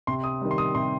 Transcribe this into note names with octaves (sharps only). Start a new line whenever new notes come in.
C3 C6
D#6
D#3 G3
C6
D#6
C3 C6